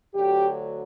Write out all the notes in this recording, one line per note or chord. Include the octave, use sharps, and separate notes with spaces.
D2 D3 F#3 G4